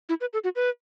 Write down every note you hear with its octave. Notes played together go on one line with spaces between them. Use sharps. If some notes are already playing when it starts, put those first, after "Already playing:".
E4
B4
A4
F#4
B4